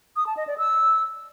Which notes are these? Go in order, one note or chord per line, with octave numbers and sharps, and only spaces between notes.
D#6
A5
D#5
D5
E6